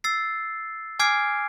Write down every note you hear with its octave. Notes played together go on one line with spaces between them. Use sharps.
E6 A6 C7
G#5 D6 F6 G#6 C7 D7